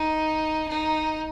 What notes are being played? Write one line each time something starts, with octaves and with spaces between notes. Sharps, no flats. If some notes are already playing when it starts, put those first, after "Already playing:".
Already playing: D#4
D#4